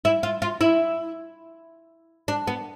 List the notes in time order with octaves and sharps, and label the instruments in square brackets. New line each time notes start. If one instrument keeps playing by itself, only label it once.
[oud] E4
F4
F4
E4
D4
B3